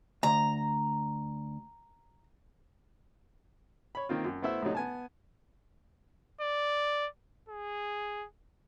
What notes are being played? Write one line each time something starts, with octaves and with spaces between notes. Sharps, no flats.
D2 A#5
C#5 B5
D#3 A#3 C4 F4
F#2
A3 B3 E4 C5 E5
A2 C3 F#3 D#4
B3 G#5 A5
D5
G#4